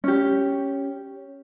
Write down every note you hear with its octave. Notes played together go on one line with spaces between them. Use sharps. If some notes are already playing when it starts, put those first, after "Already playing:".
C#4 G4